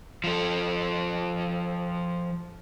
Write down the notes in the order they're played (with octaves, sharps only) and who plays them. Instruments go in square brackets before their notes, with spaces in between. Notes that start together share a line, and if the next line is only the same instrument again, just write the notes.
[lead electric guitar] F3 A4